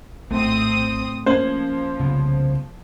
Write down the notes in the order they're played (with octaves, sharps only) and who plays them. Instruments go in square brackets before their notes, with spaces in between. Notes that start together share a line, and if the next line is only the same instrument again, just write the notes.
[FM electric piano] A#1 [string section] A2 C4 D#6 [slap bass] A3
[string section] F3 [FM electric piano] A#3 C#4 [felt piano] C5
[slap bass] C2 C#3 B3